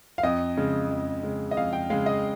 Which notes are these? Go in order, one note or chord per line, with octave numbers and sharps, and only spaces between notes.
F5
F2 D#5
C#3 G#3
F2
C#3 G#3
D#5
F2 F5
G5
C#3 G#3 F5
D#5